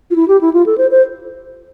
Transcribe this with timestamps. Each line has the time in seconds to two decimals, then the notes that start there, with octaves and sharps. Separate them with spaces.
0.11 F4
0.16 E4
0.28 G4
0.41 E4
0.53 F4
0.66 A4
0.78 C5
0.91 C5